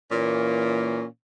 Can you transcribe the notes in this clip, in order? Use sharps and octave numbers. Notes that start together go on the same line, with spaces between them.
A#2 E3 A#3 C#4